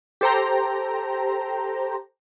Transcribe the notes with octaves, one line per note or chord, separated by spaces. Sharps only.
G4 A4 C5 G5 A#5